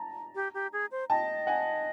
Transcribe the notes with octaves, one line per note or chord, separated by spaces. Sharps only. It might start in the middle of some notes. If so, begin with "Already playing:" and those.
Already playing: A5 A#5
G4
G4
G#4
C5
D#5 G5 A5
F#5 G#5